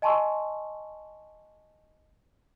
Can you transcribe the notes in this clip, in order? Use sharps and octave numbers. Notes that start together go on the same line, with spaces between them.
D#5 G#5 A5 C6 C#6 E6